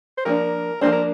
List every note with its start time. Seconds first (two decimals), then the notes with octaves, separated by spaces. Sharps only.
0.17 C5
0.25 F3 A#3 D4 A#4
0.81 F3 A#3 D4 C5
0.92 A#4